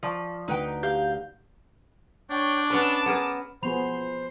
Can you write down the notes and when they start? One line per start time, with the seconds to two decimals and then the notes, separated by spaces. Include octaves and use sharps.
0.03 F3 D5 A5 C#6
0.48 D2 D#4 B4 G5
0.83 G4 F5 G6
2.30 D4 C#5 G5
2.70 B3 C#4 B4 A5 D6
3.06 B3 G#4 A#4
3.63 F3 B3 G#4 C5 B5 F7